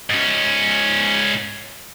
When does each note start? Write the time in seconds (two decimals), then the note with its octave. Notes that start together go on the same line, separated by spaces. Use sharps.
0.10 G#2 C#4